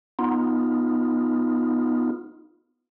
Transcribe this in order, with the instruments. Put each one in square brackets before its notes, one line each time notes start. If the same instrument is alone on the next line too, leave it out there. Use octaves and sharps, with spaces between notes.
[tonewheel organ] B3 D#4 F4